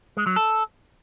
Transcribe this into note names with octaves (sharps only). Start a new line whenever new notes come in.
G#3
F#3
A4